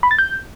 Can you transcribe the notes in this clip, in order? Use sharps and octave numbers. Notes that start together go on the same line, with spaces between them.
B5
A6
G6